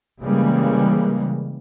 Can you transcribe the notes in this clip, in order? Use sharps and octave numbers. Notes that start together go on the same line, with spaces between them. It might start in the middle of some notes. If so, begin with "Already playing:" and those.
C#3 E3 G3 G#3 A#3